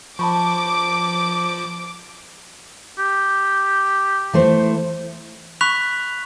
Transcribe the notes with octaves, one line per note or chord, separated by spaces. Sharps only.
F3 A5 B5 C#6 D6
G4
E3 A3 C5
B5 C#6 F#6 B6 F7